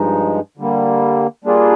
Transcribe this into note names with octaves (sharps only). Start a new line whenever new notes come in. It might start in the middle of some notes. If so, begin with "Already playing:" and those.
Already playing: G2 F3 G#3 D#4
D3 G3 A#3
G3 A#3 D4 F4 G#4